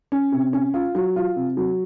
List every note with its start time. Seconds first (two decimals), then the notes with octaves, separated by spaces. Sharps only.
0.12 C#4
0.32 C3
0.53 C#4
0.74 F4
0.95 F#3
1.16 F4
1.36 C3
1.57 F#3